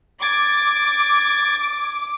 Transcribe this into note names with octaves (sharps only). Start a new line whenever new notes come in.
D6 G#6 A6